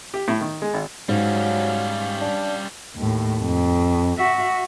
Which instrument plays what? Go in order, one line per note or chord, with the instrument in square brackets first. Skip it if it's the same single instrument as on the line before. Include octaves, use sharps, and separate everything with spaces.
[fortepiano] G4
A2
D#3
G#3
G#1
[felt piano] G#2 [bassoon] F#3 [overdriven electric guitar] G3 C#4 [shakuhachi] F5
[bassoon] D4
[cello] D#2 A2
F2
F#4 E5